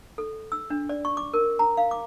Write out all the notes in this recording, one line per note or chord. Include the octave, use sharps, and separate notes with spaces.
A4
E6
D4
D5
C#6
D6
A#4
A#5
F5
D6